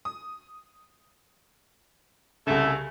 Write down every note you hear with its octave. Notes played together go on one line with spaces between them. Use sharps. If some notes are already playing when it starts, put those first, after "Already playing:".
D#6
C2 C#3 A3